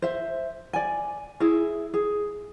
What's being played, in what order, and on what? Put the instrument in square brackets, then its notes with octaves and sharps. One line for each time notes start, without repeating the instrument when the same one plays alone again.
[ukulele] C5 E5
D5 G#5
E4 G#4
G#4